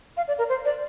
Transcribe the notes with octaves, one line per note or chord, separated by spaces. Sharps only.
F5
D5
A#4
C5
D5